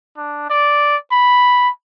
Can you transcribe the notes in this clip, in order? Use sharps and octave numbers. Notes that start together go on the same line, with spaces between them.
D4
D5
B5